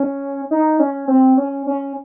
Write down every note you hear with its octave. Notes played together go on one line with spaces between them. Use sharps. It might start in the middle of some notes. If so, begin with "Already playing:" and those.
Already playing: C#4
D#4
C#4
C4
C#4
C#4